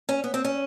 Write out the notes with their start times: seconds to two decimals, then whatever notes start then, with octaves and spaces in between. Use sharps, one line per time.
0.09 C#4
0.24 B3
0.34 C4
0.44 C#4